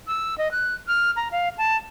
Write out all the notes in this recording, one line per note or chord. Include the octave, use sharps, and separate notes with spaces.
E6
D#5
F#6
F6
A#5
F5
A5